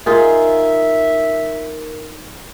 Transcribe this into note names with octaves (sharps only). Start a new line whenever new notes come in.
D#4 F4 G#4 A#4 E5